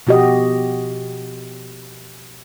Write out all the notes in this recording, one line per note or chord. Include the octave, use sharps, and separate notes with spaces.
B2 F3 F#4 G4 D#5